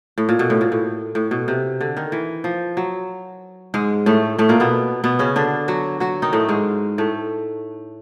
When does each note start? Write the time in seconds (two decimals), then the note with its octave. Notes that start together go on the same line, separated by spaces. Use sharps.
0.18 A2
0.29 A#2
0.39 B2
0.50 A2
0.61 A#2
0.72 A2
1.15 A2
1.31 B2
1.48 C3
1.81 D3
1.97 D#3
2.12 E3
2.44 F3
2.77 F#3
3.74 G#2 G#3
4.06 A2 A3
4.39 A2 A3
4.49 A#2 A#3
4.60 B2 B3
5.04 B2 B3
5.19 C#3 C#4
5.36 D3 D4
5.68 F#3 F#4
6.00 F#3 F#4
6.22 D#3 D#4
6.33 A2 A3
6.49 G#2 G#3
6.98 A2 A3